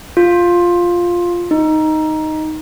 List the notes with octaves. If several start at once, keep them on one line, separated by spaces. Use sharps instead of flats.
F4
D#4